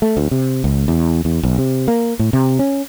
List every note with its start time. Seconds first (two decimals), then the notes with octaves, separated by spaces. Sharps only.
0.02 A3
0.17 D2
0.31 C3
0.64 C#2
0.88 E2
1.25 E2
1.43 B1
1.58 C3
1.88 A#3
2.19 A2
2.33 C3
2.59 C#4